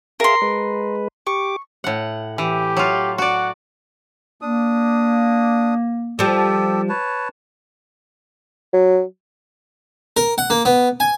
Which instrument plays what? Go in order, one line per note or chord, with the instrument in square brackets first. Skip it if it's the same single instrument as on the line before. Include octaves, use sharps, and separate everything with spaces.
[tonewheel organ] G#4 E5 F5 [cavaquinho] A#4 C6
[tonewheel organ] G#3 B4
[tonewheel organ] G4 D6 [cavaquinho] C#6
[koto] A2 F#5
[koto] E3 [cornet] G4
[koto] F#3 F4
[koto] F#4 D5 [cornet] F#5
[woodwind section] A#3 [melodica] D4 D#6
[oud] F3 G3 [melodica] G4 A4
[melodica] B4 C#5 A5
[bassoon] F#3
[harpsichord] A#4
F#5
A#3
B3
G#5